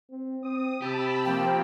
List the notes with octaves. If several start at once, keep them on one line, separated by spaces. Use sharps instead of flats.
C4
C4 D#6
C3 G4 A5 B5 E6
F3 A#3 C4 G5